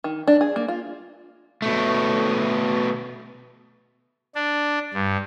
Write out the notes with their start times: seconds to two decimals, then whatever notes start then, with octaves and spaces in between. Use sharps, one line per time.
0.04 D#3
0.27 D4
0.41 G#4
0.56 A#3
0.68 F4
1.62 B2 A3
4.35 D4
4.94 G2